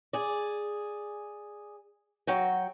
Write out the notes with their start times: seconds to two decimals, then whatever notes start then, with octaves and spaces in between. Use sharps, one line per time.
0.13 G#4 D5
2.27 F#3 F#4 G5